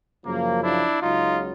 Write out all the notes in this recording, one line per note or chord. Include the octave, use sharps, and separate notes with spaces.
F#2 C#3 F3 A#3
D4 E4
C#2 C#3 F#3 D#4 F4